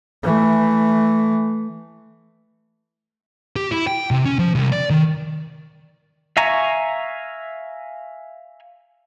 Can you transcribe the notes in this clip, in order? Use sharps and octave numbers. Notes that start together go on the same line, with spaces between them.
E3 A3
G4
E4
G5
C3
C#4
F3
C2
D5
D#3
E5 F5 G#5 A#5 C#6